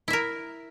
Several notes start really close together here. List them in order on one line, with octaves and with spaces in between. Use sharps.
E4 E5 A#4